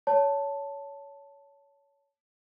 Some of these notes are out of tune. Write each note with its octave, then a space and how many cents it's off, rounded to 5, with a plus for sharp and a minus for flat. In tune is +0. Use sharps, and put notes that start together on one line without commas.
C#5 +20 A5 +5